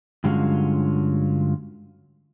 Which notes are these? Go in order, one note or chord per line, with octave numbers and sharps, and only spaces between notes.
G2 D3 F#3 G#3 C#4 F4